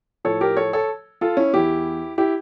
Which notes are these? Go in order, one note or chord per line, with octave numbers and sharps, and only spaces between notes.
A2 F3 A4 C#5
G4 A#4
A4 C#5
A4 C#5
F4 A4
C#4 E4
E2 E3 E4 G4
E4 G4